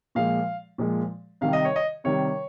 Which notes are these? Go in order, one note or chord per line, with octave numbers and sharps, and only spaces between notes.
A#2 F3 G#3 F5
A#2 F3 G#3
C3 D#3 G3 F5
D#5
C#5
D#5
C3 D#3 G3 C#5